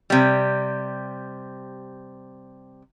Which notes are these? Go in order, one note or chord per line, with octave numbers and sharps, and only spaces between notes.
C3 G3